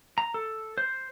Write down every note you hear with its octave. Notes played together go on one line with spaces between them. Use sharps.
A#5
A4
C5